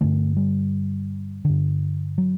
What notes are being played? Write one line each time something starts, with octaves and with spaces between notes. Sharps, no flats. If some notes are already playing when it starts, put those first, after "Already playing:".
G2 D3 A3
G3
G2 D3
F#3